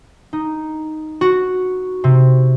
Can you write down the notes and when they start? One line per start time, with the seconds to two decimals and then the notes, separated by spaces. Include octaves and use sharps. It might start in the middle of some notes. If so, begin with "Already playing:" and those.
0.33 D#4
1.21 F#4
2.04 C3